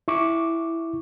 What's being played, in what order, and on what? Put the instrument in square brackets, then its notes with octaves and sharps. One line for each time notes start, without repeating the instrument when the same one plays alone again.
[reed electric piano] E4 C#6 D6